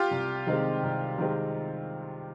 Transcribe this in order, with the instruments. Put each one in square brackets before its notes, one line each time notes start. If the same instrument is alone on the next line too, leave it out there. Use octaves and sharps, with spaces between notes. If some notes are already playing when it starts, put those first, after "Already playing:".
Already playing: [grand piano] F4 G4
[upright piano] C2
C3 D#3 G#3 C4
C2
C3 D#3 G#3 C4